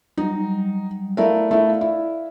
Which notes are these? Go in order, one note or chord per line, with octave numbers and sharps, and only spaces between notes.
F#3 G3 D#4
A3 E4 A#4 D5 F5
A3 E4
E4